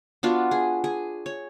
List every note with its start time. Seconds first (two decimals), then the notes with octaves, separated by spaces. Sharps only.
0.23 B3 D4 F4 F#4
0.51 G#4
0.84 G#4
1.26 C#5